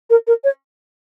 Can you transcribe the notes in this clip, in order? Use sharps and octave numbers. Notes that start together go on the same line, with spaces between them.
A#4
A#4
C#5